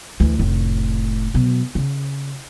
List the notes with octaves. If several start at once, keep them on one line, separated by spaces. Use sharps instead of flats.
D2 E3
F1 A2
B2 F#3
C#3